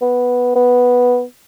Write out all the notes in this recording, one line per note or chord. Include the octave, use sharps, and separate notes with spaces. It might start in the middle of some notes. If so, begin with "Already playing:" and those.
B3
B3